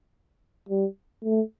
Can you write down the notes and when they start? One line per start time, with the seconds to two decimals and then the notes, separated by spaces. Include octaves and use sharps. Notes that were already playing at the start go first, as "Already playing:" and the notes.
0.69 G3
1.24 A3